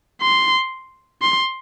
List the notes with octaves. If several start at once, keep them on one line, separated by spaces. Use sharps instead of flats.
C6
C6